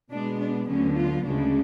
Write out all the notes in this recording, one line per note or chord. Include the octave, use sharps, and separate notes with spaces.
B2 G#3 B3 D4
D4
D2 D3 F#3 B3 C#4
F4
D2 C#3 G#3 D4